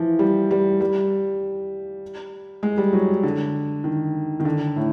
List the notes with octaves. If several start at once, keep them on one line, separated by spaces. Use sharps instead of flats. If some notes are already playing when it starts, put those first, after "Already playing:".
Already playing: E3 F3
G3
G3
G3
G#3
G3
F#3
D3
D#3
D#3
D3
A2